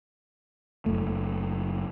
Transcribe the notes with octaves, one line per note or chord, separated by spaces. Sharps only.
F#1 F#2 A3